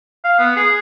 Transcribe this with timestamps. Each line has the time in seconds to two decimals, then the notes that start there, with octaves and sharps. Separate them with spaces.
0.24 F5
0.39 B3
0.56 G#4